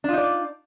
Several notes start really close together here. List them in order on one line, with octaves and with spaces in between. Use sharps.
D4 F4 D#4 D5